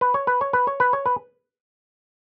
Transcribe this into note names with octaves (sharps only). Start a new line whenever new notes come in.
B4
C#5
B4
C#5
B4
C#5
B4
C#5
B4